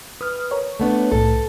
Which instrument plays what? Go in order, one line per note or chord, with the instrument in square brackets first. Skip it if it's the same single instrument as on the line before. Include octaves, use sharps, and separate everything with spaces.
[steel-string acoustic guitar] B4 [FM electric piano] D#6 F6
[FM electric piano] A#4 C#5
[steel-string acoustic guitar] A3 B3 D4
[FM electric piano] C2 A2 [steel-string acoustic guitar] A4